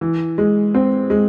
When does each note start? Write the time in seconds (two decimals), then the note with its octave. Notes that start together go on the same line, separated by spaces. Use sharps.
0.01 E3
0.38 G#3
0.75 C4
1.10 G#3